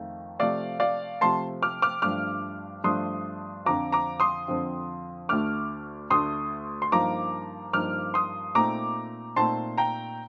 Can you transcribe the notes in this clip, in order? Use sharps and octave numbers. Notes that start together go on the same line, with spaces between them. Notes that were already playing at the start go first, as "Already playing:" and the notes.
Already playing: F2 D#3 A3 F4
C3 F3 A3 D5 F5
D5 F5
C3 F3 A3 A5 C6
D6 F6
D6 F6
G2 F3 A3 D4 D6 F6
G2 F3 A3 D4 C6 D#6
F2 D3 F3 C4 F4 A#5 D6
A#5 D6
C6 D#6
F2 D3 F3 C4 F4
D2 D3 A3 D4 D6 F6
D2 D3 A3 D4 C6 D#6
C6
G2 F3 A#3 D#4 A#5 D6
G2 F3 A#3 D#4 D6 F6
C6 D#6
A#2 A3 C4 D#4 A#5 D6
A#2 A3 C4 D#4 A5 C6
G5 A#5